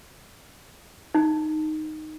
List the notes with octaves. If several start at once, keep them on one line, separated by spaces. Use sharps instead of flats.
D#4